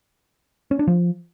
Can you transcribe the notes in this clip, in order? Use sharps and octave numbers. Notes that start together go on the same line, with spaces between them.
C#4
D4
F3